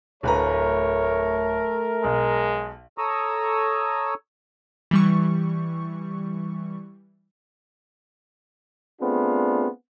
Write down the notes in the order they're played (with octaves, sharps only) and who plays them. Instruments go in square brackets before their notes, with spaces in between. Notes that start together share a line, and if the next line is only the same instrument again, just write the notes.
[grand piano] D1 B4 A#5 [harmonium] A3 [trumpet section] A#4 [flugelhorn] C#5
[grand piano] B1 [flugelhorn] G#3
[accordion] A4 C#5 A#5 C#6 D#6 E6
[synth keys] E3 G3 C#6
[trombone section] A3 B3 C4 D4 F4 G#4